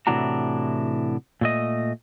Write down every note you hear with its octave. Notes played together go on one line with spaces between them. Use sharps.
A2 C3 E3 D4 F#4 A#5
A#2 A3 D#5